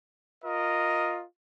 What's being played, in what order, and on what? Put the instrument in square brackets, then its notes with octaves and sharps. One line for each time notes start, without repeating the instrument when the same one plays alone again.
[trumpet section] F4 A#4 D#5